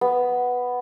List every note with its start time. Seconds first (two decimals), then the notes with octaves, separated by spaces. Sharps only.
0.01 B3